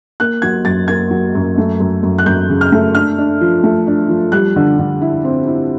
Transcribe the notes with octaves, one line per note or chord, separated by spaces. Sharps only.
A#3 F#6
F#3 G#6
F#2 A6
A#3 G#6
F#3
F#2
A3
F#2
F#2
F#6
F#2 G6
C#3
F6
A3
D4 F6
D4
F3
A3
D4
F3
G3 F#6
D3
D3
E4
C4
E4